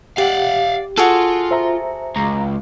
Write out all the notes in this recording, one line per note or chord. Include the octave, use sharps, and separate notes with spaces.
G4 D5 F5 F#5
F4 F#4 G#4 A4
C5 E5 A#5
C#2 A#5